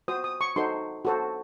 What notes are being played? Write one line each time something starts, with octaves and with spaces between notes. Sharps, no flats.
F#4 C5 D#6
D#6
C#6
D#4 F#4 A4 C5 C6
F#4 A4 C5